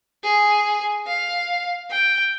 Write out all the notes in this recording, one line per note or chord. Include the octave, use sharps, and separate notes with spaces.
G#4
F5
G5